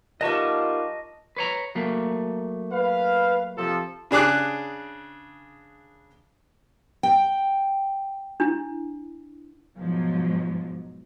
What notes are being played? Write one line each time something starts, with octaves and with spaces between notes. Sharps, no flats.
G3 B3 D#4 F4 A#4 D#5 A5 C#6
B4 C#5 A#5
F#3 A3 A#3
B4 F5
C3 F3 A4
C#3 D4 G#4 D6 F#6
G5
D4 E4
G#2 B2 F3 F#3